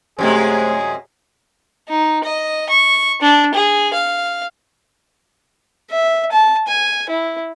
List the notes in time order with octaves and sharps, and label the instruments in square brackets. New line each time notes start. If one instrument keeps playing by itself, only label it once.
[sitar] F#2 C3 G#3 [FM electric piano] A3 G4 C5 [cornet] G#4
[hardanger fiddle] D#4
D#5
C#6
D4
G#4
F5
[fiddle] E5
A5
G#5
E4